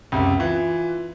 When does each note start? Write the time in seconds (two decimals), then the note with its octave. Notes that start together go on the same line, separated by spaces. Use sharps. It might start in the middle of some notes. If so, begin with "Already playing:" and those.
0.12 C#2 F#2 C3
0.40 E3 F4